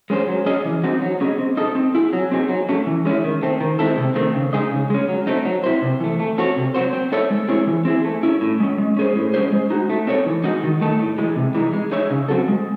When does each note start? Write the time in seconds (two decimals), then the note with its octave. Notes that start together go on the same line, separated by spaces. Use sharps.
0.10 G#3 C#4 G#4 C5
0.28 F#3
0.46 C#4 G#4 D#5
0.65 E3
0.84 C4 D#4 F#4
1.02 F#3
1.21 C#4 G#4 D#5
1.39 C4
1.57 D#4 A4 D#5
1.75 C4
1.95 E4 G#4
2.13 F#3
2.32 C4 D#4 G#4
2.49 F#3
2.69 A3 C#4
2.87 E3
3.05 G#3 C#4 E4
3.24 D#3
3.42 A3 C4
3.61 D#3
3.79 G#3 C4 E4 A4
3.98 C3
4.15 D#3 A3 C4
4.35 C#3
4.53 G#3 D#4 G#4 D#5
4.71 C#3
4.90 G#3 C#4
5.09 F#3
5.27 A3 C4 D#4
5.45 F#3
5.64 C4 E4 C5
5.82 C3
6.00 E3 A3
6.20 A3
6.38 C4 F#4 A4 C#5
6.57 C3
6.74 F#3 C4 F#4 C5
6.93 C4
7.12 D#4 A4 C#5 E5
7.30 G#3
7.48 C4 E4 G#4 C#5
7.67 E3
7.85 C4 E4 G#4
8.04 A3
8.23 C#4 E4
8.41 A2
8.60 G#3 C#4
8.78 G#3
8.97 C#4 G#4 C5
9.16 A2
9.34 G#3 C#4 G#4 C5
9.52 G#3
9.70 D#4 F#4
9.89 A3
10.07 C4 D#4 A4 C#5
10.26 E3
10.44 G#3 D#4 F#4
10.63 D#3
10.81 A3 D#4 A4
10.99 A2
11.18 E3 G#3
11.36 C3
11.55 E3 G#3 D#4
11.73 G#3
11.91 D#4 G#4 C#5 E5
12.11 C#3
12.28 F#3 C4 F#4 A4
12.48 G#3